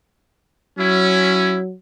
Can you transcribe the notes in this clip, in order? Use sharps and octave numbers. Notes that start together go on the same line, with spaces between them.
F#3 C#4 E4